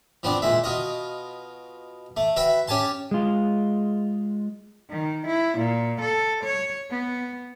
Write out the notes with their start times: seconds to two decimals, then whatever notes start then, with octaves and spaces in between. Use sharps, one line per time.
0.23 F3 B3 C4 D4
0.42 A#2 G#3 E5
0.64 B2 F4 D#5
2.17 A3
2.36 F#4 B4 E5 G5 B5
2.68 C#4 G4 G#5 A5 C6
3.11 G#3 F4
4.90 D#3
5.27 E4
5.58 A#2
6.01 A4
6.44 C#5
6.90 B3